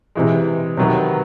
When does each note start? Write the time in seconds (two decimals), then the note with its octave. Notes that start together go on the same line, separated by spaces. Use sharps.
0.15 C3 E3 G#3
0.77 C3 D#3 F#3 B3